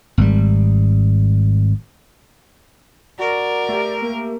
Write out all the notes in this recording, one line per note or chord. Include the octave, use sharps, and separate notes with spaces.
G#1 G3
F#4 A#4 D5
A3 G4
A#3